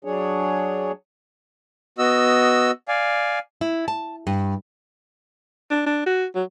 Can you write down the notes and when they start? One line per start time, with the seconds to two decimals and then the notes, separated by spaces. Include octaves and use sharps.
0.05 F#3 D4 G#4 C#5
1.98 B3 F#4 D#5 E6
2.88 D5 F5 G#5
3.61 E4
3.88 A5
4.27 G2
5.71 D4
5.86 D4
6.06 F#4
6.35 F#3